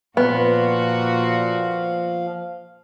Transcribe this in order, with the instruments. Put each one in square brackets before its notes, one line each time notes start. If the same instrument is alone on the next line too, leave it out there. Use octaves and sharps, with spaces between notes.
[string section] A#2 F#4 [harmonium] F3 F5 [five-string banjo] B3